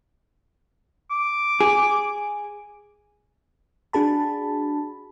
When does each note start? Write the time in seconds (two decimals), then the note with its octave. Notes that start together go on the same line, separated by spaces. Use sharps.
1.11 D6
1.61 G#4
3.93 D4 F#4 G#4 A5 B5